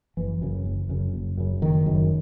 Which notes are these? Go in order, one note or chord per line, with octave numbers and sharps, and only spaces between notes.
F#1 E3
F#2 C#3
F#1
F#2 C#3
F#1
F#2 C#3
F#1 D#3
F#2 C#3